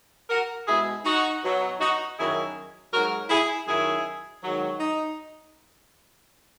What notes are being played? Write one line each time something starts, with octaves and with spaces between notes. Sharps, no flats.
F#4 A#4
B2 G#3 E4 G#4
D#4 F#4
B2 F#3
D#4 F#4
F#2 D#3 F#3 E4 G#4
G#2 F#3 F#4 A#4
E4 G#4
F#2 D#3 F#3 E4 G#4
G#2 D#3 F#3
D#4